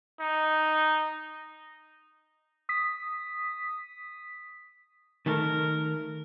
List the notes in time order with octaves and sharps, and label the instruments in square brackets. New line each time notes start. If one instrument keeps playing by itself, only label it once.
[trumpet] D#4
[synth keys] D#6 B6
[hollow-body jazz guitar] D#3 A3 A4 [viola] A#4